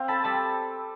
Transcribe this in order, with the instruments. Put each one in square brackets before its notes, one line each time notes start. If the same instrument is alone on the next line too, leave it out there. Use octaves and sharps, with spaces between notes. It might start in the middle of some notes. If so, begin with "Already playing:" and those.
Already playing: [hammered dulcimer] C4 [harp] F5
[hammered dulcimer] A4 [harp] A5 B5
[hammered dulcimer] G3 [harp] A5 B5